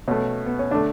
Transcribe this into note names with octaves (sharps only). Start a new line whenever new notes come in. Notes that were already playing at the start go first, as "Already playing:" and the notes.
B2 A3 C#4
B3
C#4
D3 A3 D4